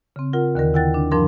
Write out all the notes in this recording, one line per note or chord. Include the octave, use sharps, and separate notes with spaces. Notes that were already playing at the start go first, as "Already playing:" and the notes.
C#3 C4
F4 A#4 F#5
D#2 D3 D#3 A#4
E4 F#5 G5 F#6 A6
D4
G2 F3 D4 A#4 A5 C6